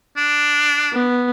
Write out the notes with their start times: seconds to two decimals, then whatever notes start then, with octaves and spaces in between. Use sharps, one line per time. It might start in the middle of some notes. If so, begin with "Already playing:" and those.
0.17 D4
0.93 B3